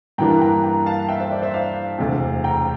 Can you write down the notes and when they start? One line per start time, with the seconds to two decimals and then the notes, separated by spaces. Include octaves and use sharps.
0.18 G2 E3 G3 A#3 D4 G5 A#5
0.42 G5 A#5
0.64 G5 A#5
0.86 F5 A5
1.09 E5 G5
1.20 C5 E5
1.31 D5
1.42 C5 E5
1.54 D5 F5
1.98 E1 D2 C3
2.44 G5 A#5